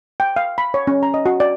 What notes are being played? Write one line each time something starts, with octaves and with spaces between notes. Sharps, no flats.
G5
F5
B5
C#5
C#4
A#5
D#5
F#4
D5